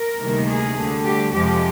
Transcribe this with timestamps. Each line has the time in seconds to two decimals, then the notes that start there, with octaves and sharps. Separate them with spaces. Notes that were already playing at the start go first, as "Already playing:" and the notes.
Already playing: A#4
0.20 D2 C3 D#3 G3 A#3
0.48 G#4
0.77 D2 D3 G3
1.05 G4
1.33 F2 C3 F3 G#3 G4